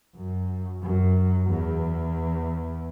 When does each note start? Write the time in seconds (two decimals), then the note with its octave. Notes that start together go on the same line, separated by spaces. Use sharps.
0.15 F#2
0.82 F#2
1.50 E2